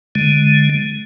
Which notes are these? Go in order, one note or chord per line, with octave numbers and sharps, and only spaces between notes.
D3 G#3